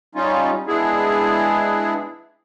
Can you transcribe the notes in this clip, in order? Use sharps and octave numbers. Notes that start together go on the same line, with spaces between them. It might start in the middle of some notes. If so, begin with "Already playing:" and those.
G3 C#4 D#4 F4
G#3 B3 D4 E4 G#4